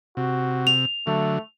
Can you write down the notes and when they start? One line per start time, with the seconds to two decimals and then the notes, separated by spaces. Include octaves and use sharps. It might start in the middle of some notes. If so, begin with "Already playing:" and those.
0.17 C3 F#4
0.67 F7
1.07 D3 F#3 A3